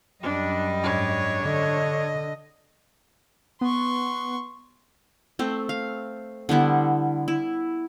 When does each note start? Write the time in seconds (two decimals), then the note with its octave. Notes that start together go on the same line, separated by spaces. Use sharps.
0.23 F#2 G3 D4 D#5
0.82 G#2 D4 C#5
1.43 D3 D#5
3.61 B3 C6 C#6
5.39 A3 C4
5.69 F5
6.49 D3 G3 B3 E4
7.28 E4